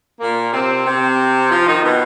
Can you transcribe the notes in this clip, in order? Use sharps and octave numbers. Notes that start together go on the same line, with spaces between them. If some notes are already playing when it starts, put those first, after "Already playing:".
A#2 A#3
C3 C4
C3 C4
F3 F4
D#3 D#4
B2 B3